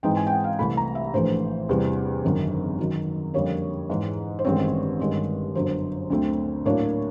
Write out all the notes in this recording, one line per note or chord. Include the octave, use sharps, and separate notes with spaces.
G#2 E3 G#3 C4 D#4 G5
G#5
G5
F#5
F5
C2 C3 E3 A3 B5
A#5
E5
A#1 A2 E3 A3 C5
E2 C3 E3 G3
G#1 F#2 D3
F#2 D#3 F#3
F2 D3 G3 A#3 C#5
G#2 E3 G#3
C5
A1 G2 D#3 G#3 C4 C#5
G1 G2 D#3 G#3 C#4
G1 F#2 D3 F#3 C5
D2 D3 F#3 A3 C4
A2 F#3 A#3 D4 C#5